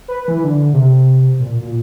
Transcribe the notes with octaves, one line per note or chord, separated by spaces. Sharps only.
B4
E3
D3
C3
A#2
A#2